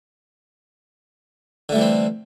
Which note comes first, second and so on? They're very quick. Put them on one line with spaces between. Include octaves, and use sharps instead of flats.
D3 A3 G3 E3 C4